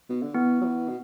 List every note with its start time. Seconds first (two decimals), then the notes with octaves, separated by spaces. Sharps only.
0.09 B2
0.22 D3
0.35 E3 B3
0.61 F#3
0.65 E3
0.89 B2